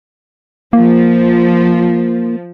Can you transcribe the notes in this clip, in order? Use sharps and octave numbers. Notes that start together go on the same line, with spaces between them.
F3 A#3